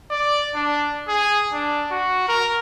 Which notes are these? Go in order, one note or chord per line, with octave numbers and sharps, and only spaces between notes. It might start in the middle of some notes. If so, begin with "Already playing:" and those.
D5
D4
G#4
D4
F#4
A#4